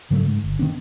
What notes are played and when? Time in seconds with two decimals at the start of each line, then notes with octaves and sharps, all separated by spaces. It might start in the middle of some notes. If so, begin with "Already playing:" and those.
0.11 G#2 C#3 F#3 A3
0.23 G#2
0.44 G1
0.59 D#3 B3 C#4 D4